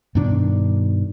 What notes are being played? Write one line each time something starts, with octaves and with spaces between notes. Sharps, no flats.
G2 B2 D#3 D4